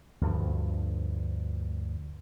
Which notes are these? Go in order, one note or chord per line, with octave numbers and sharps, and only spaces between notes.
D2 G2 F3